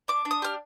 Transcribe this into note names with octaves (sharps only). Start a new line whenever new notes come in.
D4 D6
D4
D#6
G4 F6